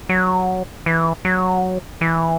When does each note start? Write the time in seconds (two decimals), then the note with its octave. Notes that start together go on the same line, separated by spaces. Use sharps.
0.09 F#3
0.86 E3
1.25 F#3
2.01 E3